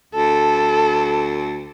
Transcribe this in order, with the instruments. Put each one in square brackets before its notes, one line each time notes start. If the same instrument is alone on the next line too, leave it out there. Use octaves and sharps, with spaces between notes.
[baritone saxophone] D2 [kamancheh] A4